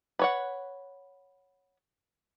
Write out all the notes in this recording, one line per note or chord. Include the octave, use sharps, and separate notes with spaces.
B4 C#5 F#5